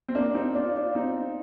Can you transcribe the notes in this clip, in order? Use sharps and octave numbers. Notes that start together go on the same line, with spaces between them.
C4
A#3 D4
C4 D#4
D4 F4
D4 F4
C4 D#4